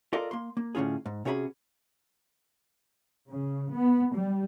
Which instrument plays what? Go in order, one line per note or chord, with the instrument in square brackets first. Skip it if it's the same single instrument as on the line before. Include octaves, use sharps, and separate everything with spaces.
[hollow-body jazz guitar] F4 A4 A#4 D5 D#5 F5
A#3 C6
A#3
A2 D3 C#4 F4 G#4
G#2
C3 C#4 F#4 G#4 D#5 B5
[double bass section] C#3
B3
G3